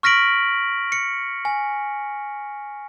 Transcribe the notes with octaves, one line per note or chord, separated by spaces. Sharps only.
C#6 F6 A#6 B6 D7 F#7
C#7
G#5